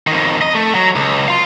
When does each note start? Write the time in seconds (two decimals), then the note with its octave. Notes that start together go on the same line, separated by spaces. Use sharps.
0.07 F2 D#3
0.42 D#5
0.55 A3
0.75 F#3
0.96 C#2
1.28 F5 C6